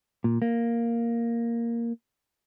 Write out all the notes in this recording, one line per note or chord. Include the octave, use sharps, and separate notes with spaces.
A#2
A#3